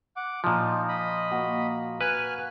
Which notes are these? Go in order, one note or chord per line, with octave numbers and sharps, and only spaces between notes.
F#5 D6
A#2 F3 D#4
D#5 B5
A#3 F#4 A#5
B4 G#5 F6 F#6